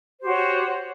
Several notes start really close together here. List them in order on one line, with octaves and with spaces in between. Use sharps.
C5 G4 F#4 C#5